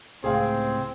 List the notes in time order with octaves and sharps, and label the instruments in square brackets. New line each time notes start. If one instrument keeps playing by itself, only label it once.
[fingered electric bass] C#2 A2 C3 [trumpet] C4 [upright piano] G#4 F5